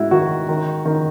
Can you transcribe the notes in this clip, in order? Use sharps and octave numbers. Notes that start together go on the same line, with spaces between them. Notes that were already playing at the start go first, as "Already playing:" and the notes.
Already playing: G#2 E4 F#4
D#3 F#4
D#3
D#3